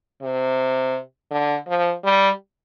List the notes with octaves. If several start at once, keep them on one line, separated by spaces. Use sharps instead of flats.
C3
D3
F3
G3